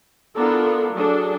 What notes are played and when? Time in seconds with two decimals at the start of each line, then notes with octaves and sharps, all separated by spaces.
0.36 B3 D4 E4 F4 A4 A#4
0.95 F#3 D4 G#4 A4